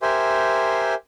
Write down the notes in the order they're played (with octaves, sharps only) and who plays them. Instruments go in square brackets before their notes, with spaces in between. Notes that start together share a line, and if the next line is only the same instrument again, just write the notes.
[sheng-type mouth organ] G4 A#4 C5 E5 G#5 C6